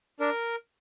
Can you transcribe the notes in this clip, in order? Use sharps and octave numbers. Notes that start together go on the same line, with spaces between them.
D4 A#4